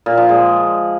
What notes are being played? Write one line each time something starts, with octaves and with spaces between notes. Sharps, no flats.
A#2
F3
G#3